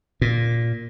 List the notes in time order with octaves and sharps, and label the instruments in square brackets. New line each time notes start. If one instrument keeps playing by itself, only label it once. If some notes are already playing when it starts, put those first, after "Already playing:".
[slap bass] A#2